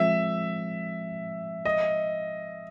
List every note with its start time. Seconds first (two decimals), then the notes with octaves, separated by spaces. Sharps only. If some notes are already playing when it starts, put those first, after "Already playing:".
Already playing: F3 G#3 C4 E5
1.65 D#5